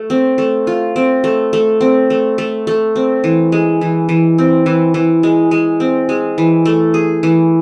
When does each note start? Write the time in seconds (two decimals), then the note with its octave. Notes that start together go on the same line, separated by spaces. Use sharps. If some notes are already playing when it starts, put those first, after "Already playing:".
Already playing: A3
0.10 C4
0.38 A3
0.67 F4
0.96 C4
1.24 A3
1.53 A3
1.81 C4
2.10 A3
2.38 A3
2.67 A3
2.96 C4
3.24 E3
3.52 G#3
3.81 E3
4.09 E3
4.38 C4
4.66 E3
4.94 E3
5.23 G#3
5.51 G#3
5.80 C4
6.09 G#3
6.38 E3
6.66 A3
6.94 G#4
7.23 E3